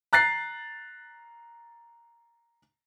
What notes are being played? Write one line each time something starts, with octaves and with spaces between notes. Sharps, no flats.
A#5 F#6 A6 C7